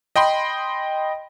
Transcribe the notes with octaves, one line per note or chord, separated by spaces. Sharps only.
D#5 G5 B5 C6